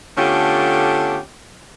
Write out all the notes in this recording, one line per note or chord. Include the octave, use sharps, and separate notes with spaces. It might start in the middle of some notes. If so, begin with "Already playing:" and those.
D3 A3 B3 C#4 F4 G4